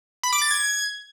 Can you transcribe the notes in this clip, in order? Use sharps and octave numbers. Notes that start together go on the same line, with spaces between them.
B5
D6
A6
G#6